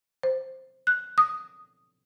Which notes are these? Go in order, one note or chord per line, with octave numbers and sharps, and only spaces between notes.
C5
F#6
D#6